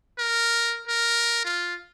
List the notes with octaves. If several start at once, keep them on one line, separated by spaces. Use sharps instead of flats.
A#4
A#4
F4